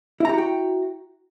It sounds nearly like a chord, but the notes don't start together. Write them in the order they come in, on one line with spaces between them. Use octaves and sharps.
E4 A#5 G4 F#4 G5